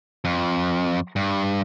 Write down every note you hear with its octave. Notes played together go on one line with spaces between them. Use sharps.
F2
G2